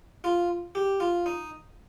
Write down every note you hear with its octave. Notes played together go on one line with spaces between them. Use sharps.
F4
G4
F4
D#4